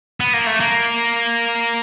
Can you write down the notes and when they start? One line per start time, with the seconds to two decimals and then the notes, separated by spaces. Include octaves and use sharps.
0.20 B3
0.34 A#3
0.47 A3
0.60 A#3